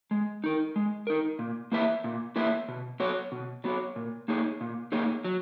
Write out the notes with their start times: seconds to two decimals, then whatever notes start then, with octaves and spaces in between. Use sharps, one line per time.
0.11 G#3
0.44 D#4 A#4
0.76 G#3
1.07 D#4 A#4
1.39 A#2
1.72 A#3 E4 B4 E5
2.04 A#2
2.36 A#3 E4 B4 E5
2.68 B2
3.00 F#3 B3 F#4 C#5
3.32 B2
3.64 F#3 B3 F#4 C#5
3.96 A#2
4.28 A#3 D#4 G#4 C#5
4.61 A#2
4.92 A#3 D#4 G#4 C#5
5.24 F#3